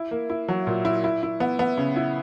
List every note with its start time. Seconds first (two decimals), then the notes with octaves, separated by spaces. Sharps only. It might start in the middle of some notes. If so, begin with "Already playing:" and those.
Already playing: E4
0.11 A#3
0.30 E4
0.48 F#3
0.67 A#2
0.85 E4
1.04 E4
1.23 E4
1.40 B3
1.59 B3
1.77 C#3
1.96 E4